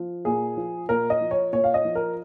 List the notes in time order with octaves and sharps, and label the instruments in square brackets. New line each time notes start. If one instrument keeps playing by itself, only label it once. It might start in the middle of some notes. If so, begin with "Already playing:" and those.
Already playing: [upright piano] F3
A#2 G#4
F3
A#2 A#4
D#5
F3
C#5
A#2 C#5
F5
D#5
F3
A#4